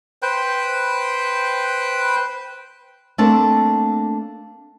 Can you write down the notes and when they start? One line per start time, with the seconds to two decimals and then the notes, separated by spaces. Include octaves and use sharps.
0.22 B4 C5 G5
3.18 A3 A#3 C4 D4 A5